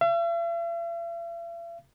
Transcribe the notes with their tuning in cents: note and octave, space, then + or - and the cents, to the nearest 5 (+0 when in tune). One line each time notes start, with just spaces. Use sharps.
E5 +45